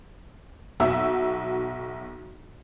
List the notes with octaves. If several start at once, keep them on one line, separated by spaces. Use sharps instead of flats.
B1 D#4 F#4 E5 E6